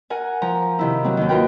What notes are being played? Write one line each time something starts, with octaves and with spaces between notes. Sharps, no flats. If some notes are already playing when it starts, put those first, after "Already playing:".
A#4 F#5 G#5
F3 A#5
C3 D#3 E4
F#3 C4
D#2 D#3
F4 F#4 A#4 B4 G5